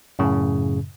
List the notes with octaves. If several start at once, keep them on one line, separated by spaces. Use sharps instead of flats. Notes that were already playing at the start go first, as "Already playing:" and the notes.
F#2 A2 C#3